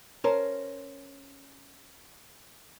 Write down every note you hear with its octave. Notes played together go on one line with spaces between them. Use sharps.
C#4 A#4 C5 A5